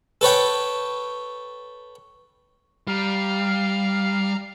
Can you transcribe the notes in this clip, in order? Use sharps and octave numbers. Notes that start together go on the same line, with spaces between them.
A4 B4 C#5 G5
G3 F5 A#5 F6